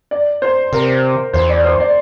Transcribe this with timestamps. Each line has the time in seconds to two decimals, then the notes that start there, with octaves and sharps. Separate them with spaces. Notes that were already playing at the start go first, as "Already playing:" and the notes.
0.11 D5
0.42 C5
0.73 C3 A#4
1.33 E2 C5
1.49 D5
1.64 C5
1.80 D5